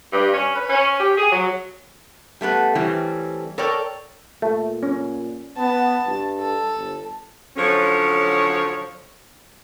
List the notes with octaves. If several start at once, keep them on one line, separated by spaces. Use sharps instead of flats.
G2
C#4
B4
C#4
G4
G#4
F#3
G3 A3 B3 B4
E3 G3 A3 C4 C#4
A4 A#4 C#5 D5 G5
A#2 A3
C#4
B3 A5
G2
A4
G1
D3 F3 F#3 C#4 C#5